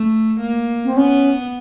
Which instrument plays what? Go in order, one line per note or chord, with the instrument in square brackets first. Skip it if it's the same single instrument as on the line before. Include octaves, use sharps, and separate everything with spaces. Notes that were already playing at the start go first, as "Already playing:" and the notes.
Already playing: [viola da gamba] A3
A#3
[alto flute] C4
[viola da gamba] B3 [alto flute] C#4